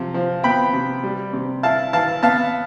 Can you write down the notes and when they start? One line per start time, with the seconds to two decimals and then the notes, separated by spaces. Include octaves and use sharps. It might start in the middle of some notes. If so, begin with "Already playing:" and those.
Already playing: C3 F3
0.14 F3
0.44 B3 G5 B5
0.73 C3
1.03 G3
1.33 C3
1.63 E4 F5 A5
1.93 E3 F5 A5
2.23 B3 F5 A5